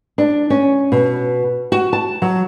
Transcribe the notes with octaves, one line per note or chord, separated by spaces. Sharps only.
D4
C#4
B2
F#4
A5
F#3